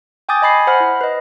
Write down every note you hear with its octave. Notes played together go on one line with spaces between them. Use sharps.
G5 G#5 D6 D#6 G6 A6
D#5 G#5 B5 A6 C7
C5 F#5 B5 F6
E4
B4 D#5